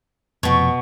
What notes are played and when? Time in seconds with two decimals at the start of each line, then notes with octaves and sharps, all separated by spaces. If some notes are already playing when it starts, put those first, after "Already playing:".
0.43 F1 B2 F3 B3 C#6